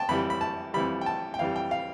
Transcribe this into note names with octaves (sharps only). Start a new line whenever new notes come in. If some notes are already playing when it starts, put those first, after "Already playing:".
Already playing: G5 A5
F2 E3 G3 B5
B5
A5
F2 E3 G3 B5
G5
A5
G5
F2 E3 G3 F5
G5
F5